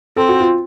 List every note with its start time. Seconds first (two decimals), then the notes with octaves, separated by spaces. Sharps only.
0.16 C4 A4
0.29 F#4
0.40 F4